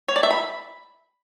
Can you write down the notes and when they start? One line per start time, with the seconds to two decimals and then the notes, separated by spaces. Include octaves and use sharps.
0.08 C#5
0.16 D5
0.23 E5
0.30 B5